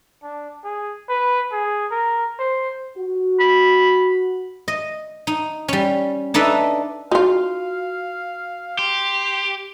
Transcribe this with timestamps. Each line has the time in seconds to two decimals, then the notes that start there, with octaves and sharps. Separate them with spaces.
0.23 D4
0.64 G#4
1.09 B4
1.52 G#4
1.91 A#4
2.39 C5
2.97 F#4
3.40 B5
4.68 D#5
5.27 D#4
5.68 G3 C#4
6.34 D4 D#4 A4 B4 E5
7.12 D#4 F4 F#4 F5
8.79 G4 C6